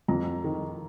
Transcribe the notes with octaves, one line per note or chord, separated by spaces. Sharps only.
F2 A#5
D#3